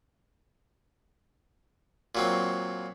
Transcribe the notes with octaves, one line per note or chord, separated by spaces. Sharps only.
A#2 F#3 C4